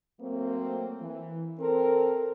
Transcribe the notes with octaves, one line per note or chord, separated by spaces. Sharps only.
F#3 A3 A#3 C4
E3
C4 A4 A#4